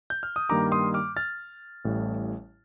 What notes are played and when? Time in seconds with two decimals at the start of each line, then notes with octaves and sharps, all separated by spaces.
0.10 G6
0.23 F6
0.36 D#6
0.49 G2 D#3 G3 A#3 A#5 D6
0.72 C6 D#6
0.94 D6 F6
1.17 F6 A6
1.85 A1 A2 G3